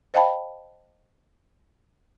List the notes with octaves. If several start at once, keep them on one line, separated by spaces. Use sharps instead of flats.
C5 D#5 F5 G5 A5 B5